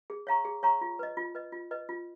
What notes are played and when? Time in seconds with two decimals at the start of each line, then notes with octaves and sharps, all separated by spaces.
0.10 G#4
0.27 C#5 F5 A#5 C#6
0.45 G#4
0.63 C#5 F5 A#5 C#6
0.81 F4
0.99 B4 D#5
1.17 F4
1.35 B4 D#5
1.52 F4
1.71 B4 D#5
1.89 F4